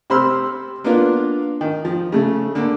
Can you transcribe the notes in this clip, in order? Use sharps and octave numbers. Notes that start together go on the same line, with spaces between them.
C3 C5 B5 C6 E6 F6
A#3 B3 D4 F4
D#3
F3
C#3 A3
D3 A#3